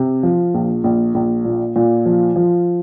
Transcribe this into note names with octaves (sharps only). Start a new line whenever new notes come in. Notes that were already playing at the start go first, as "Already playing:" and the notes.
Already playing: C3
F3
A#1
A#1
A#1
A#2
A#2
F3
F3